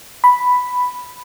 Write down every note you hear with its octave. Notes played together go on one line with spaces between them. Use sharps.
B5